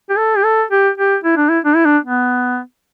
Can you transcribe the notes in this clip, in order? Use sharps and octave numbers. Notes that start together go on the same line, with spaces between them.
G4
A4
G4
A4
G4
G4
E4
D4
E4
D4
E4
D4
B3